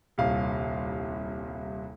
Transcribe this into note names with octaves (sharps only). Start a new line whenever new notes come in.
D#1 C2 F5